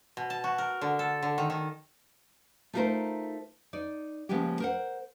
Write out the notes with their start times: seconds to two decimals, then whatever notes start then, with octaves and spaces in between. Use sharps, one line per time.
0.17 B2
0.30 A5
0.44 F#4
0.58 A#4
0.81 D3
0.99 A4
1.22 D3
1.38 D#3
1.50 D#3
2.73 A3 D#4 F4 A4 A#4 C5
3.73 D#4 D5
4.29 C#3 F3 G#3 A#3 B3 G4
4.60 A#4 C5 F#5